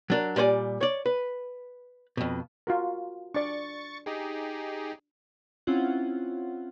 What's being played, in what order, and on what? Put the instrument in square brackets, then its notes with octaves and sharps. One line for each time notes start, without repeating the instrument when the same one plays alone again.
[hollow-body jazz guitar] F#3 D4 A#4
A#2 G3 C5 D5 G#5
C#5 D5
B4
F2 B2
[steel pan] F4 F#4 A#4
[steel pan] D4 D5 [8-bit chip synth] C#6 A6 C#7
[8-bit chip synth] D#4 G4 G#4
[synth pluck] C4 C#4 E4 F4 F#5